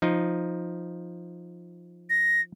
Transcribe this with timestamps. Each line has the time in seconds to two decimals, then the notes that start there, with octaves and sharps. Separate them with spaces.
0.02 F3 D#4
2.10 A#6